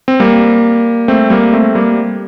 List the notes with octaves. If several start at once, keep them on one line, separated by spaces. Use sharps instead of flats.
C4
G3 A#3
A3 C4
G3 A#3
A3 C4
G3 A#3